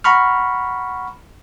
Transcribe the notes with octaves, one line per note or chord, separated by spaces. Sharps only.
F#5 A#5 B5 C#6 F6